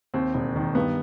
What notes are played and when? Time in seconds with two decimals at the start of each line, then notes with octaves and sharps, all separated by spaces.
0.14 D#2 C4
0.34 E1
0.56 D#3
0.75 G2 B3